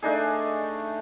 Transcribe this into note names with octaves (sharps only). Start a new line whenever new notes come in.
A3 D4 D#4 G#4